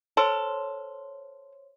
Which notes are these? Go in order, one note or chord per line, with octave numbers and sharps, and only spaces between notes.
A4 C5 C#5 C6